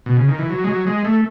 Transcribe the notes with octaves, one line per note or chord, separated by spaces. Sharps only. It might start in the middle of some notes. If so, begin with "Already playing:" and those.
B2
C#3
D#3
E3
F#3
G#3
F#3
G#3
A3